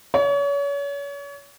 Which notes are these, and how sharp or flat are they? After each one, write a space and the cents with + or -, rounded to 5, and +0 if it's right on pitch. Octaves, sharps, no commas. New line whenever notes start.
C#5 +35